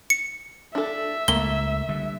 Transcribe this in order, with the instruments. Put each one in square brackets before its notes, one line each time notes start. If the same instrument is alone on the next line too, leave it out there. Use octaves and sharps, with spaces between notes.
[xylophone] C#7
[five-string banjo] D4 A4 [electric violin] E5
[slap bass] C#2 [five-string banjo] A3 A#3 [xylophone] G7
[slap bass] D3 G3